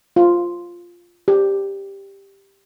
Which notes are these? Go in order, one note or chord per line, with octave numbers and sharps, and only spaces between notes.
F4
G4